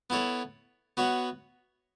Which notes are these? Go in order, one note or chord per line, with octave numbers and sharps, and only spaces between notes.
B3 E4 A4 C#5
B3 F#4 C#5 E5